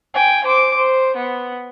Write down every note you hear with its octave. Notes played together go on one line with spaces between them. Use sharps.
G5 G#5
C5 D6
C5
B3